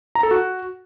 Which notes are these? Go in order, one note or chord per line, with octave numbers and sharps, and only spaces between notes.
A#5
A4
F#4